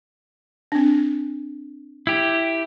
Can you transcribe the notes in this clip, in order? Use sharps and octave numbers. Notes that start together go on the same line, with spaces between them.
C4 D4
E4 G4